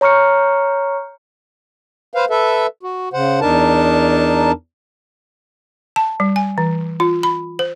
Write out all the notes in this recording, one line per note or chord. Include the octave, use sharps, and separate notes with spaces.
C#5 A#5 C#6 F6 C#7
B4 C5 F5
A4 B4 E5
F#4
C#3 C5 F#5
E2 D4 D#4 A#4 A5
A5
G3
G#5
E3
F4
B5
C5